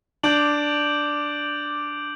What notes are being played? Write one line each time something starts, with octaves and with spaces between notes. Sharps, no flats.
D4 D6 G6 D7 F#7